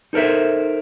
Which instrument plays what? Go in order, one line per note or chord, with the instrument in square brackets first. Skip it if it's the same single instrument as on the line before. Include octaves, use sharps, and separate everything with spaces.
[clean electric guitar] D#4 A4 A#4 C5 E5